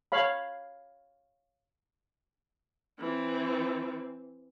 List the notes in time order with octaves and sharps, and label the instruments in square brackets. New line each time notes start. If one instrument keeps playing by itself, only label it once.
[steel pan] C#5 F5 B5
[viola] E3 C4